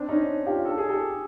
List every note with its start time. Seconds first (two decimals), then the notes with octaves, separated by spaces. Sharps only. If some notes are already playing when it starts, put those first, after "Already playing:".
Already playing: C4 D4
0.09 C#4 D#4
0.46 F4 G4
0.65 A4
0.78 G#4
0.89 G4 A4